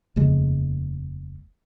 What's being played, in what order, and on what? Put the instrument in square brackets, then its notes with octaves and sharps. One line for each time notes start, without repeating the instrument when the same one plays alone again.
[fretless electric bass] F1 D#2 C#3 G#3